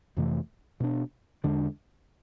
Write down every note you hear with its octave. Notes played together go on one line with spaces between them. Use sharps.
F2 C3 E3 A3
B2 B3 D4
E2 D3 G#3 D4